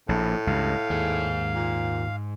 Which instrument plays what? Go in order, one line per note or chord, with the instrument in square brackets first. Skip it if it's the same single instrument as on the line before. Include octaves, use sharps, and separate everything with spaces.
[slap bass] A#1 [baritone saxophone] A2
[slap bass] C#2 G2 [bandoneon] F5
[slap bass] D#2 [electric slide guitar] G#2 G#4
[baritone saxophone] A#2